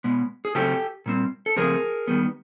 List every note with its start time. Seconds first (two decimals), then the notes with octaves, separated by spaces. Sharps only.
0.04 B2 G#3 B3
0.45 G#4
0.55 C#3 F#3 A3 C4 G4 A4
1.06 A#2 G3 C4
1.46 A4
1.56 C#3 F3 A3 C4 G#4 A#4
2.08 D#3 G3 B3